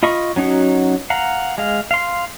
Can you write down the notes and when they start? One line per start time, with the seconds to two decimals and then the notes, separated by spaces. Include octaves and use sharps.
0.03 F4 D#5 B5 C#6
0.36 F#3 C#4 D#4 F#4
1.10 F5 F#5 A#5
1.58 G#3 F5
1.91 F5 C6